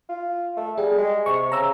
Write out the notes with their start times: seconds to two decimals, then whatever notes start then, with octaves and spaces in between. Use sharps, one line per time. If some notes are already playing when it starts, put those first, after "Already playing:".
0.09 F4
0.57 A3
0.78 G3 G#4
0.98 G#3
1.26 C3 C#6
1.52 C#3 A#5 E6